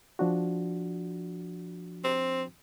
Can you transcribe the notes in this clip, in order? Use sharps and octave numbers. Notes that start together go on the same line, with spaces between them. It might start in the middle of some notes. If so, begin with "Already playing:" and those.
F3 D4 F#4
C4